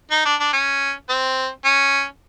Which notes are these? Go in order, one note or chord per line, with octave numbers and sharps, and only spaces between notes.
D#4
D4
D4
C#4
C4
C#4